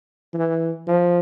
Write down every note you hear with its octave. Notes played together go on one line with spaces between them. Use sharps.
E3
F3